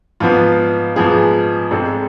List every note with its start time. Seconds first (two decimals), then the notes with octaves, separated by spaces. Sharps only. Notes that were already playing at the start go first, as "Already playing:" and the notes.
0.20 G#2 F3 B3 F4
0.96 G#2 F3 B3 G#4
1.71 G#2 G#3 C4 A4